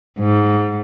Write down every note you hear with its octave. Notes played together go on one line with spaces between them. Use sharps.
G#2